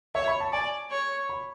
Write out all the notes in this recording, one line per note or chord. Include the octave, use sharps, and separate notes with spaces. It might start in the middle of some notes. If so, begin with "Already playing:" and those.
C#5 E5
B5
A5
D5 G#5
C#5
B5